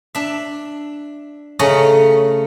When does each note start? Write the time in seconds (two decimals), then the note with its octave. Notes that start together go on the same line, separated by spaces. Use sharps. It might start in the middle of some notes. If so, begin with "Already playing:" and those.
0.15 D4 E5
1.59 C#3 A3 C#4 D#5 A#5